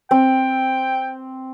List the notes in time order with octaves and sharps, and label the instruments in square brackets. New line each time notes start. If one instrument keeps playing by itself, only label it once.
[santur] C4 [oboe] G5